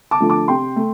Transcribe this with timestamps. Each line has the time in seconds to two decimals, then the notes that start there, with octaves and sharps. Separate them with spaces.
0.11 A5 D6
0.20 D3 F3 A3
0.30 A5 D6
0.48 C3 G5 C6
0.76 A3